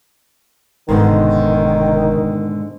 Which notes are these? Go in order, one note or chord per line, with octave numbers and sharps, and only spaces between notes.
F1 G#2 B2 D3 D#3